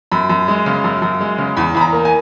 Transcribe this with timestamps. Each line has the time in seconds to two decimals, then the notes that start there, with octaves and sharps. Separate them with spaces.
0.12 F#2 B5
0.30 F#2
0.48 G#3
0.66 C#3
0.84 F#2
1.02 F#2
1.21 G#3
1.38 C#3
1.57 E2 B5
1.75 E2 B5
1.81 A#5
1.93 A#3
2.05 G#5